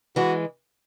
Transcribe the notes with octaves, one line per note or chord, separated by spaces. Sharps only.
E3 G#3 F#4